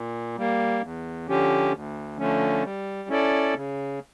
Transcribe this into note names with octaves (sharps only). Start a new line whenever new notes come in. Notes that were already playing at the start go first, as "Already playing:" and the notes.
Already playing: A#2
G3 A#3
E2
D3 F3 C#4 G4
D2
D3 F3 A3 C#4
G3
C#4 E4 A4 D5
C#3